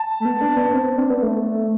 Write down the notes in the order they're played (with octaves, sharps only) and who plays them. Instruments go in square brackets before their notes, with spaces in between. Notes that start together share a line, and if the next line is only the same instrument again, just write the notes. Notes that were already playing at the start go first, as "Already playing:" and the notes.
Already playing: [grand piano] A5
[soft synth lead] A3
B3
D4
B3
C4
C4
D4
B3
A3